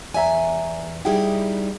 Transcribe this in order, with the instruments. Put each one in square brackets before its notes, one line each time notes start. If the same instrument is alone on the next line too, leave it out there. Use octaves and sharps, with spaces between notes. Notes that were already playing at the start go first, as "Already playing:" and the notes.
[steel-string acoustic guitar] E2 G#5 [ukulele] D5 E5 A#5
[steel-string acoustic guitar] G3 D#4 E4 [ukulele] G#4 G5